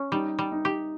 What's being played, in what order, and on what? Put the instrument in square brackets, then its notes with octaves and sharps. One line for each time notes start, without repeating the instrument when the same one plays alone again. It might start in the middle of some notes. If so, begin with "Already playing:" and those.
Already playing: [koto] C#4
[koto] G3 [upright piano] D#4
[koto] G3
[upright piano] D#4
[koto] G4